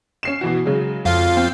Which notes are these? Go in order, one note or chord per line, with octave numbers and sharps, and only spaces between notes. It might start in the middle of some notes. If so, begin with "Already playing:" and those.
C#4 C7 E7
B2 E3 F#4
C#3 F#3 G#3
F2 F4 F5
C4